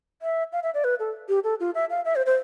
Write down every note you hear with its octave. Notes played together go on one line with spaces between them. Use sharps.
E5
F5
E5
D5
B4
A4
G4
A4
F4
E5
F5
E5
C5
C5